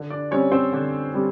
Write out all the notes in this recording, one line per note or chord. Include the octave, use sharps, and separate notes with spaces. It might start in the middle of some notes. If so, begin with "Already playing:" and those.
Already playing: D3
D4 D5
G3 C4 C#4 C#5
C4 C5
D3
G3 C4